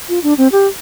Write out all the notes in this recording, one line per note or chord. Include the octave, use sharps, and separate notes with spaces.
F4
D4
C4
G4